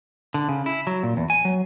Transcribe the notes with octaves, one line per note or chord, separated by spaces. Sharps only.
D3
C#3
E4
F#3
A#2
E2
G#5
F#3